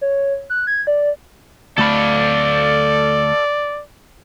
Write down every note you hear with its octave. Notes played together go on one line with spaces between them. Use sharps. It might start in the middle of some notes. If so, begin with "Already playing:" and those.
C#5
F#6
G#6
D5
D2 A3 A4 D5 F5 B5